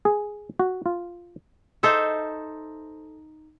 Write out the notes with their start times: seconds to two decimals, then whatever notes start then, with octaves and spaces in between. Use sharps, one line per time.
0.05 G#4
0.59 F#4
0.86 F4
1.83 D#4 A4 C5 E5